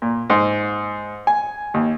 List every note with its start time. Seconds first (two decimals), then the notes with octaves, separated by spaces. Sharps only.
0.02 A#2
0.30 G#2
1.27 G#5
1.74 D#2